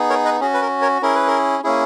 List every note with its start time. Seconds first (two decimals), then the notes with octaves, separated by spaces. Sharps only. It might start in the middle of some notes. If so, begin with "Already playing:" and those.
Already playing: B3 D#4 G#4
0.10 A#4 C#5
0.25 B4 D#5
0.40 C#4 F#4 G#4
0.54 B4
0.61 A#4
0.81 A#4 C#5
1.02 C#4 E4 G#4 A#4
1.15 B4
1.27 A#4
1.63 A#3 C#4 E4 G#4